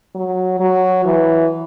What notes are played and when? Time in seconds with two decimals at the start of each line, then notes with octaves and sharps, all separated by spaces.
0.15 F#3
0.60 F#3
1.05 E3